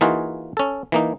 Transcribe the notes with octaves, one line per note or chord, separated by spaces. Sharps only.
E3 A#3 D#4 F4 F#4 G#4
C#4 A4
E3 A#3 D#4